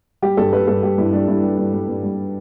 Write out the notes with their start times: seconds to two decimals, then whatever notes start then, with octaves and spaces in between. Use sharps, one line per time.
0.22 G3 G4
0.37 G2 A4
0.53 G3 B4
0.67 G2 A4
0.83 G3 G4
0.98 G2 E4
1.13 G3 D4
1.28 G2 E4
1.43 G3
1.58 G2
1.73 G3
1.88 G2
2.03 G3